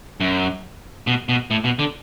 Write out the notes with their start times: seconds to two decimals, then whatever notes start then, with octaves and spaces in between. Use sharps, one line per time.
0.21 F#2
1.07 B2
1.29 B2
1.51 A2
1.64 B2
1.79 D3